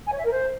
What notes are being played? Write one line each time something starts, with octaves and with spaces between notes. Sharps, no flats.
G#5
C#5
E5
A#4
C5